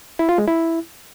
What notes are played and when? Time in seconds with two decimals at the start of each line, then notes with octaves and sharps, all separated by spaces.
0.19 E4
0.29 F4
0.38 G#3
0.48 E4